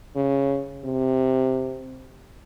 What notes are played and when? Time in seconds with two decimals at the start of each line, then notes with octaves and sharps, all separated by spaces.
0.16 C#3
0.85 C3